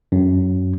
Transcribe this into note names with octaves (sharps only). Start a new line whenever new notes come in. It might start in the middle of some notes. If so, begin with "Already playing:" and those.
F#2